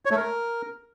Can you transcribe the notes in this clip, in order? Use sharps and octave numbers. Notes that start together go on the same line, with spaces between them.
C#5
A3
A#4